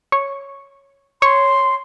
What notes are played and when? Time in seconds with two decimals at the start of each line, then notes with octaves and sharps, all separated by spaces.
0.12 C#5
1.22 C#5 C6